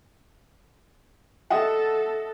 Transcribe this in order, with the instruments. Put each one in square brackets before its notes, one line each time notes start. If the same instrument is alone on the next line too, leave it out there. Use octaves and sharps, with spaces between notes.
[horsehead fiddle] A4 [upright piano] D#5 E5 F#5